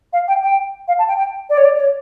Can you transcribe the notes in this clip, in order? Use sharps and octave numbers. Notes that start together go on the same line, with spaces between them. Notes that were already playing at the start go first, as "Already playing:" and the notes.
F5
G5
G5
F5
A5
G5
G5
D5
C#5
D5
D5
C#5